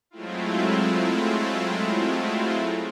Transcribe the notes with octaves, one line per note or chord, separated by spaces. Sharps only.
F#3 G#3 A3 C4 E4 F4